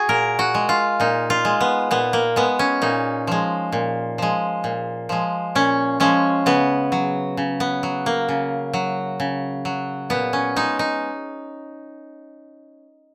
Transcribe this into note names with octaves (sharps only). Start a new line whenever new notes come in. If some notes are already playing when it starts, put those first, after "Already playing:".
Already playing: F#4 G#4
A#2 A#4
F#4
G#3
F4
A#2 D#4
F4
G#3
B3
A#2 B3
A#3
G#3 B3
C#4
A#2 D#4
F3 G#3
A#2
F3 G#3
A#2
F3 G#3
A#2 C#4
F3 G#3 C#4
C#3 B3
F#3
C#3
B3
F#3
A#3
C#3
F#3
C#3
F#3
A#2 B3
C#4
G#3 D#4
D#4